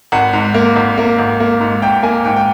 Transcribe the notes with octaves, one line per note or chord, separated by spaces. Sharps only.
G#1 F#5
G#2
A#3
G#1
A#3
G#1
A#3
G#2
G#1 G5
A#3 G#5
G#2 G5
G5